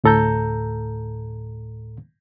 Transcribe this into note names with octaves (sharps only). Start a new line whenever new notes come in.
D2 A2 A4 A#5 G6